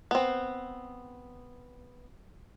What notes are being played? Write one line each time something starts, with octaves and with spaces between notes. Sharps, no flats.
B3 C4